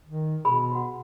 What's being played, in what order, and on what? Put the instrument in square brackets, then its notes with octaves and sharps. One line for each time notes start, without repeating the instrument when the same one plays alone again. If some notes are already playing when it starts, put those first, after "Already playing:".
[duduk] D#3
[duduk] B2 [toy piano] G#4 B5
[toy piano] F#4 F#5